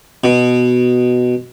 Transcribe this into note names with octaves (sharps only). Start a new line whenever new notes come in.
B2